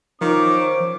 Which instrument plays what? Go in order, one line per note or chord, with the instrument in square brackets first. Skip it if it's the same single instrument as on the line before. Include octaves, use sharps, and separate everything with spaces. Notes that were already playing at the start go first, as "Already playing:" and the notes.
[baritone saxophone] D#3 [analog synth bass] F3 [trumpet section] C#4 D6